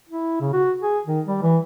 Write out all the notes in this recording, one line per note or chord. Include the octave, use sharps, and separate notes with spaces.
E4
C#3
F#4
G#4
D#3
G3
E3